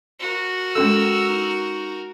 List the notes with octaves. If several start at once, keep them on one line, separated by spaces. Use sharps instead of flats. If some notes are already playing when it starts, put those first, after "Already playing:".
F#4 A#4
G#3 C#4 A4 E6
D#4